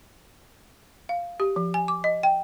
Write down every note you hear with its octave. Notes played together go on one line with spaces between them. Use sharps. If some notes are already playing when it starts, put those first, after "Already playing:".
F5
G4
F3
G#5
D6
D#5
G5